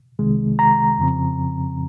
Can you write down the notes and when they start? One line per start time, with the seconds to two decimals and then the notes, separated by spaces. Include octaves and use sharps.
0.19 C2 C3 D#3 G#3
0.59 A#5
0.99 F2 C#3 F3 C4